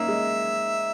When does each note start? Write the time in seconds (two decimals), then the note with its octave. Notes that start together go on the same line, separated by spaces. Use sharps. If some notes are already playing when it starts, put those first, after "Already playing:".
Already playing: A#3 C#4 D#4 E5
0.08 G#3